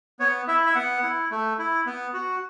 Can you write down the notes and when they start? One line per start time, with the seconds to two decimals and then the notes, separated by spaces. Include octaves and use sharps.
0.20 B3 C#5
0.48 E4 E5
0.66 E5
0.75 B3 F#5
1.03 E4
1.31 A3
1.59 E4
1.86 B3
2.14 F#4